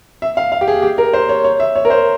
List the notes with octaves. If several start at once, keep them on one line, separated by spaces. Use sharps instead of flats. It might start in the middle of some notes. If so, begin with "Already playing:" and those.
E5
F5
F5
G4
G#4
G4
A#4
C5
C#5
C#5
E5
C#5
A#4
C5